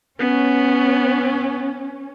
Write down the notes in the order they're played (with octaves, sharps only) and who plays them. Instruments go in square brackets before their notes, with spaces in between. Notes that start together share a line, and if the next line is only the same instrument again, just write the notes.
[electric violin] B3 [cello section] C#4